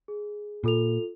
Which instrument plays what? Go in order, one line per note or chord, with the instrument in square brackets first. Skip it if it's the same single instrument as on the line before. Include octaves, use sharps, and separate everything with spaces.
[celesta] G#4
[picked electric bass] A#2 [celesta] F4 A4 F7